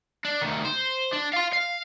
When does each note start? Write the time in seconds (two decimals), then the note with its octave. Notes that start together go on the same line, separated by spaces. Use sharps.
0.25 D4
0.41 D2 D#3
0.65 C5
1.13 D4
1.33 F5 C6
1.53 F5